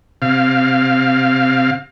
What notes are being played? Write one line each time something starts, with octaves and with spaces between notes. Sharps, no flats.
C3 F5